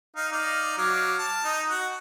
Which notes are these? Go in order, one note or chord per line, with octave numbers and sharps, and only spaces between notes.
D#4 F5
D#4 D5 F5
F#3 F5 D6
A5
D#4 D#6
F#4 F#5